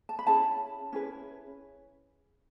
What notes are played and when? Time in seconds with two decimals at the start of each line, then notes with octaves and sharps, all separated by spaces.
0.09 A5
0.19 B5
0.26 C#4 E4 G#4 A5
0.92 C#4 E4 G#4 B4